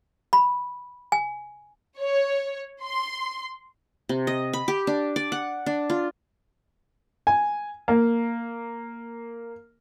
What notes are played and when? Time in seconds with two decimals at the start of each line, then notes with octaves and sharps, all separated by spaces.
0.33 B5
1.12 G#5
2.00 C#5
2.83 C6
4.09 C3
4.27 D#5
4.53 B5
4.68 G4
4.87 D4
5.16 D5
5.32 F#5
5.66 D4
5.90 F4
7.27 G#5
7.88 A#3